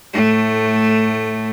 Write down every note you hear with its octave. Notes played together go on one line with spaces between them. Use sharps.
A2 A3